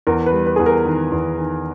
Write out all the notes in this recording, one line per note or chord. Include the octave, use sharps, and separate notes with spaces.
E2 A#4
B4
G3
B4
E2 G#4
A#4
D#3
E2
D#3